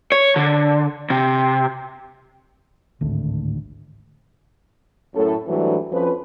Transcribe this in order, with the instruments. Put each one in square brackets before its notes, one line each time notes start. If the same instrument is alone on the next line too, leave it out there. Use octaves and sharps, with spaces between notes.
[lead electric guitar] C#5
D3
C3
[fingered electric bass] G#1 D2 A2
[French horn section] F#2 A2 A4
G#2 E3 F#3 G3 A3 D4
F2 F3 C#4 B4